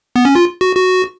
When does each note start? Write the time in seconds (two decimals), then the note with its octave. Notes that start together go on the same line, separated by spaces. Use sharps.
0.16 B3
0.25 C#4
0.35 F4
0.61 F#4
0.76 F#4